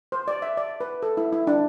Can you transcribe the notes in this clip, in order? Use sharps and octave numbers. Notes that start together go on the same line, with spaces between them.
C5
D5
E5
D5
B4
A4
E4
E4
D4